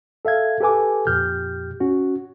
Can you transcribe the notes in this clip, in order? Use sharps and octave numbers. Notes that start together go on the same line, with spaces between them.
A4 E5 F5 G#6
G4 A4 B4 G#5 D6
F2 A#2 G4 F6 G6
C#4 F#4